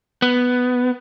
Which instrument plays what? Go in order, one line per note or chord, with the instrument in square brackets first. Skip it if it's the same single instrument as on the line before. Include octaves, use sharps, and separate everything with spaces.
[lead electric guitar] B3